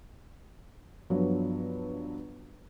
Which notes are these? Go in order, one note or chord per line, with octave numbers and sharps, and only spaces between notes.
G2 F3 F#3 B3 D4